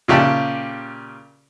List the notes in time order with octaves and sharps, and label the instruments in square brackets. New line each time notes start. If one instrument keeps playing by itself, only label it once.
[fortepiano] A#2 C#3 G4 E5 A5